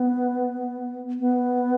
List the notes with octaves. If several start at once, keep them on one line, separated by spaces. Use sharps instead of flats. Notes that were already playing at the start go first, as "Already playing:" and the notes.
Already playing: B3
B3